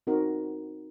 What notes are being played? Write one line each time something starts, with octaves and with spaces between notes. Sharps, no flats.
C4 D#4 F#4 A#4